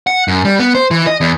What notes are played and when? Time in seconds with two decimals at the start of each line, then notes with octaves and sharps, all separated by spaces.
0.07 F#5
0.28 F#2
0.45 G3
0.59 B3
0.75 C5
0.91 E3
1.07 D#5
1.21 E2